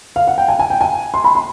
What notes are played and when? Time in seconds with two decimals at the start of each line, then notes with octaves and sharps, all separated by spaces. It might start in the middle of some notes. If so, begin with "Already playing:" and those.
0.16 F5
0.27 F#5
0.38 G5
0.48 G#5
0.59 G#5
0.70 G5
0.81 G#5
1.14 C6
1.24 B5
1.35 C6